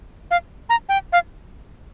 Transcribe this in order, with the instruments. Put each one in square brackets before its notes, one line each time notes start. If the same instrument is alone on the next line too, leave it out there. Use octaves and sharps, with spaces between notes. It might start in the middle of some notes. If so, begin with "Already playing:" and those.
[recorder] F5
A#5
G5
F5